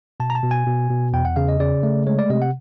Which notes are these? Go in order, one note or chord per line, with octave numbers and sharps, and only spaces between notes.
B2 A5
A#5
A5
B2
G#5
B2
B2
E2 G5
F#5
C#3 F5
D#5
C#3 D5
A3
G#3 C#5
D5
C3 D#5
F#5